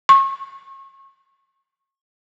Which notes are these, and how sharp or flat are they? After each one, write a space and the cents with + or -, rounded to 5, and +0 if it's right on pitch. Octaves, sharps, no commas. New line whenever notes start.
C#6 -35